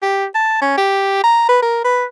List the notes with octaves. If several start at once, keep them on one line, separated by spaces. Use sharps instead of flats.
G4
A5
C#4
G4
A#5
B4
A#4
B4